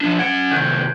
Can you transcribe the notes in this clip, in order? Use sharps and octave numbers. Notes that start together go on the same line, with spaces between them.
F3 D4
C#4 F#5 G#6 D7 E7
C2 D#3 F#6 G6